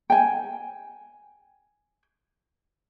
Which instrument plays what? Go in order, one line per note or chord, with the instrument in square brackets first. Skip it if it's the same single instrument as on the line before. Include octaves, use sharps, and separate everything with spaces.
[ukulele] G5 G#5